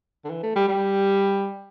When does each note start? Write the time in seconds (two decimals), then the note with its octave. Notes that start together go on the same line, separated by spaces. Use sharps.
0.25 D3
0.30 E3
0.43 A3
0.56 G3
0.68 G3